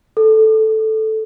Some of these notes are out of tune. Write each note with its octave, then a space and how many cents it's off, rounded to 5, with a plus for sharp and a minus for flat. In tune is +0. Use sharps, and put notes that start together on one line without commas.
A4 -5